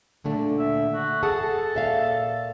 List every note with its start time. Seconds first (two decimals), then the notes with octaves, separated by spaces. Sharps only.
0.24 A#2 D3 A3
0.59 E5
0.93 F#4
1.23 G#4 A4 F#5 A5
1.75 A#2 E5 F5